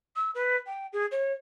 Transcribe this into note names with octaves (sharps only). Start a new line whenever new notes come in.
E6
B4
G5
G#4
C#5